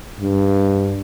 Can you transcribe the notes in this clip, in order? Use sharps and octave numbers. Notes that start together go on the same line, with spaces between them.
G2